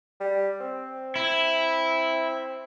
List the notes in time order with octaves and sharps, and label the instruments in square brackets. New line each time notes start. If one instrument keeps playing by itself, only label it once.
[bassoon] G3
C4
[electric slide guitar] E4